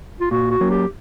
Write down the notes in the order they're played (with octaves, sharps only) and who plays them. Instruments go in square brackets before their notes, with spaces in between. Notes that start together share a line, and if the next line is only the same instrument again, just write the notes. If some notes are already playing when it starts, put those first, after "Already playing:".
[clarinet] F4
[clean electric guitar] A#2 [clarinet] F#4
[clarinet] F#4
[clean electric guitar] F#3 A#3 C#4
[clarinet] G4